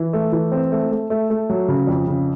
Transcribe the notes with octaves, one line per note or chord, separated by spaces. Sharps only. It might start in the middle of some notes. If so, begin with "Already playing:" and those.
Already playing: E3
A3
E3
C4
A3
A3
A3
A3
F#3
C#3
F2
C#3